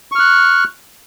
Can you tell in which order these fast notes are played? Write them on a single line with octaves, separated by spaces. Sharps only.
C#6 F6 F#6